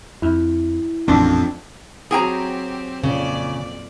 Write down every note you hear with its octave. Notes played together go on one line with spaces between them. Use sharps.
F2 E4
A1 F2 A#2 D4
F#3 C4 G4 G#4 G5 A#5 C#6
F2 A#2 C#3 D5